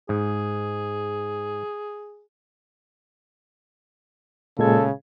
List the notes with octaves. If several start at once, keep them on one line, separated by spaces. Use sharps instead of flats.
G#2 G#4
A#2 C#3 G#3 A4 G#6